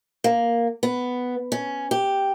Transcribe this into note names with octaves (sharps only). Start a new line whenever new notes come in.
A#3
B3
C#4
G4